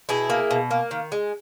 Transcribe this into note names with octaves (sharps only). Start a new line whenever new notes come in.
B2 E4 G#4
A#3
B2
A#3
D#3
G#3